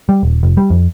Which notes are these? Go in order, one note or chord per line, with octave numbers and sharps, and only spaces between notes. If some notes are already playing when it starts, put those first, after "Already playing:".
G3
D#1
F1
G3
F2